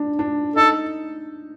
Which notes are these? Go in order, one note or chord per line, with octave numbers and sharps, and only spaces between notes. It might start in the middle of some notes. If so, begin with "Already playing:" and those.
Already playing: D4
D4
D#4 A4